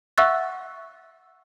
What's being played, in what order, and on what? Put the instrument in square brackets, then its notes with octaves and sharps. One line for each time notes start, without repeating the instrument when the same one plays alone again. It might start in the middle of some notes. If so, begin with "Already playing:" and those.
[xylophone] E5 F#5 C#6 E6 F#6 A6